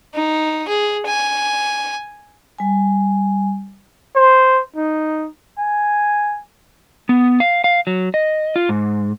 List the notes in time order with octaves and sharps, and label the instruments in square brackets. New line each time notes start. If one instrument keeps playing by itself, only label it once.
[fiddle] D#4
G#4
G#5
[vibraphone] G3 G#5
[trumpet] C5
D#4
G#5
[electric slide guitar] B3
F5
F5
F#3
D#5
F4
G#2